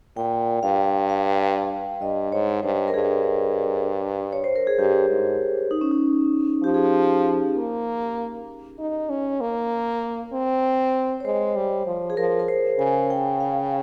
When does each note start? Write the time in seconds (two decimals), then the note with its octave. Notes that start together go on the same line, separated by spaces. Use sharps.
0.17 A#2 G5
0.63 G2 F5
1.09 F5
2.01 G2 D#5
2.32 G#2 C#5
2.63 G2 C5
2.88 A#4
2.94 G2 G#4
4.33 C#5
4.44 C5
4.56 A#4
4.67 G#4
4.79 G2 G4
5.09 G#2
5.71 D#4
5.81 C#4
5.91 D#4
6.63 F3 G4
6.74 G#4
6.86 G4
7.55 A#3
8.79 D#4
9.10 C#4
9.41 A#3
10.33 C4
11.20 C#5
11.25 G#3 C5
11.56 G3
11.87 F3
12.10 G#4
12.17 F3 A#4
12.39 A#4
12.48 C5
12.79 C#3 G#5
13.10 G5
13.40 F5